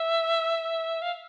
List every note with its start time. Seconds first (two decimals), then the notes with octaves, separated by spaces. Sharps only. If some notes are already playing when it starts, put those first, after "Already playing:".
Already playing: E5
1.02 F5